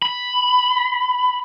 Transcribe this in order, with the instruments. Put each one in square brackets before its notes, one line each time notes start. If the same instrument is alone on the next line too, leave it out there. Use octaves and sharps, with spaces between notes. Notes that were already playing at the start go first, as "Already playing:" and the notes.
[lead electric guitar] B5